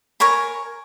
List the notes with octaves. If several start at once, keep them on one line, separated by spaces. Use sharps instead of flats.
A#4 C#5 G#5 B5